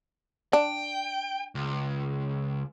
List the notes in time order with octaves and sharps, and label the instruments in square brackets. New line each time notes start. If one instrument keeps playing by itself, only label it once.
[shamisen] D4 [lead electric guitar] G5
[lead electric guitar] C#2